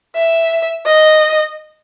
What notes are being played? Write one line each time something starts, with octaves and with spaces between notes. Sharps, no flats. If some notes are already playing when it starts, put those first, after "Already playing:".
E5
D#5